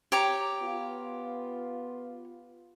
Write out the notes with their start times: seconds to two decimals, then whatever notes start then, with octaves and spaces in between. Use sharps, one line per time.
0.12 G4 C#5 A#5
0.62 B3 F4